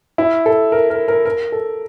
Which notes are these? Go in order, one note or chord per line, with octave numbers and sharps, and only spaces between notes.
E4
A4
A#4
A#4
A#4
A#4
A4